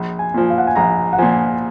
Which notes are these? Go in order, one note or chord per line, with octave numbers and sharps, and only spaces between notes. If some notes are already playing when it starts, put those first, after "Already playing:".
Already playing: A#1
G#5
A#2 F3
F5
F#5
G#5
A#1 A#5
F#5
A#2 F3 G#5